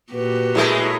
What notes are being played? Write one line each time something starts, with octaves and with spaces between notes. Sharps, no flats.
A#2 F#4 G4 B4
A2 G#3 A3 E4 G#4 A#4